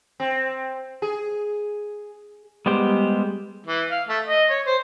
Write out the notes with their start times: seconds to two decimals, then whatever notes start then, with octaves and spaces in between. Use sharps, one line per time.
0.20 C4
1.02 G#4
2.66 G3 G#3 B3 G4 C5
3.67 E3
3.91 F5
4.09 A3
4.27 D#5
4.50 C#5
4.66 C5